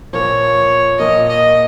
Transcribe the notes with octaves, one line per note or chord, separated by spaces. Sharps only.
A#2 F3 A#3 C#5
A#2 F3 A#3 D#5
D#5